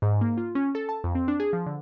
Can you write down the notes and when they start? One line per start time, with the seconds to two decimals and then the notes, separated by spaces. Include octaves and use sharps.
0.02 G#2
0.21 A#3
0.38 F4
0.55 C#4
0.75 A4
0.89 A5
1.04 F2
1.15 C4
1.28 D4
1.40 G#4
1.53 F3
1.66 D3